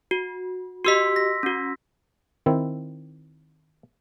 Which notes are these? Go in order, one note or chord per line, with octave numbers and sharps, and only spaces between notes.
F#4
F#4 G4 D#5 C6 E6 B6
A#6
C#4 F#4
D#3 C4 E4